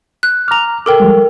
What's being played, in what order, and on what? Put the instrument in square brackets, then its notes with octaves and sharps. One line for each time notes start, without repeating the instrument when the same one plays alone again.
[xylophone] F#6
[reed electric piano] A#5 F6 [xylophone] D6 F7
[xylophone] A4 A#4 G5 [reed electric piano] D6
[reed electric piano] F3 G3 G#3